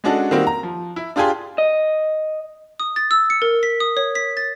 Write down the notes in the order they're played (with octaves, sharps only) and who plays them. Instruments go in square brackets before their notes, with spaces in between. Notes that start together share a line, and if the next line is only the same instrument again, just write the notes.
[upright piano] G#3 C#4 D4 F#4 A4
D#3 G3 A#3 C4 F#4
A#5
F3
E4
D4 F4 G4 G#4 G#5 C6
[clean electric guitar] D#5
[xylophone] D#6
A6
E6
C#7
A#4
B6
D#6
C#5
B6
A6